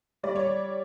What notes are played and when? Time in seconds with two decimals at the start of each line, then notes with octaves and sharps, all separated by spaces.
0.23 G3 D5
0.36 C#5